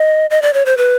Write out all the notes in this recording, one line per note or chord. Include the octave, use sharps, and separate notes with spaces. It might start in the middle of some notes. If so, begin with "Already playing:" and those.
Already playing: D#5
D#5
D5
C#5
C5
B4